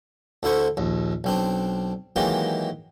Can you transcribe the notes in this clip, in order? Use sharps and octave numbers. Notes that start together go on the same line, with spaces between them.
D2 D3 E4 C5 C#6
A#1 D#2
B1 C4 D4
D#3 E3 F#3 G#3 A#3 G4